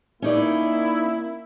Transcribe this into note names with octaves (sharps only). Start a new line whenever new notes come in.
A#3 C#4 D#4 E4 D5